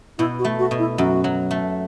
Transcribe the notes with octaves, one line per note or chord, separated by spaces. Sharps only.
B2 E4
F#4
A3
F#4
B2
E4
F#2 F#4
F#3
A3